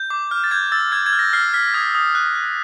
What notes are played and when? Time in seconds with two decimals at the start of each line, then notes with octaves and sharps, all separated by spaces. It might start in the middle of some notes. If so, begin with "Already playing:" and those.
Already playing: G6
0.10 D6
0.31 F6
0.44 A6
0.51 G6 G#6
0.72 E6 A6
0.92 F6 G#6
1.06 G#6
1.13 F6
1.19 A#6
1.33 F6 C7
1.54 F6 B6
1.74 D#6 G#6
1.95 D#6
2.15 F#6
2.35 F#6